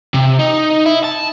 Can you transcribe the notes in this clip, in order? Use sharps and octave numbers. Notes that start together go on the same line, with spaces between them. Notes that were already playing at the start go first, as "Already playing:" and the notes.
C3
D#4
E4
A5